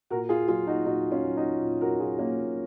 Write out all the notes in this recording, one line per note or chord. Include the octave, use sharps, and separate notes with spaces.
A#2 F#4 A#4
F4 G#4
F#3 F4 G#4
D#4 F#4
A#2 D#4 F#4
C#4 F4
F#3
D#4 F#4
A#2
F#4 A#4
F#3 F4 G#4
A#3 C#4
A#2